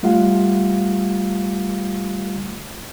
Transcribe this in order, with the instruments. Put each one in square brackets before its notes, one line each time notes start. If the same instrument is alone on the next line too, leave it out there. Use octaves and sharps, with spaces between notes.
[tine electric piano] G3 A3 F4 G4 F5 F#5